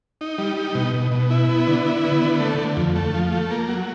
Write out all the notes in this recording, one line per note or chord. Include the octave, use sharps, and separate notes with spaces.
D#4
G3
D#4
B2
B2
B2
E4
B3
D3
E4
B3
D3
A3
D3
F2
A3
F3
A3
A#3
F#3